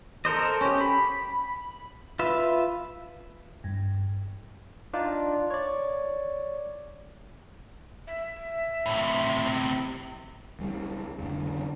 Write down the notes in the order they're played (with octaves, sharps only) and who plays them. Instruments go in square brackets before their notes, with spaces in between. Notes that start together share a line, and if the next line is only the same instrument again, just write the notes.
[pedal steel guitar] A4 A#4 C5 D#5
C#4 G4
B5
F4 B4 E5
[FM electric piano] G2
[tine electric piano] D4 D#4 F4 D5
C#5 D5
[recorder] E5
[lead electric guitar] A2 C3
[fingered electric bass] C#2 G3
F1 D3